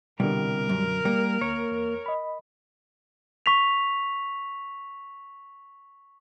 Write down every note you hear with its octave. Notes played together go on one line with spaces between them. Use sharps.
C2 B2 D3 G3 A#4
F#2
G3 A#3
D2 C#5
E2
D#5 B5
C#6 B6 F7